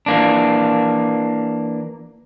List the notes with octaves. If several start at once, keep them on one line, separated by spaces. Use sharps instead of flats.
E3 A#3 D4